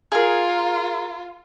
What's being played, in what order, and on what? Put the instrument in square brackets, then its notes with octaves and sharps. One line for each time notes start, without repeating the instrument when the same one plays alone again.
[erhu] F4 [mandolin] G#4 A#4